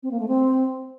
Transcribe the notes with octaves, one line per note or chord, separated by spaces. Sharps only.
C4
A#3
A3
C4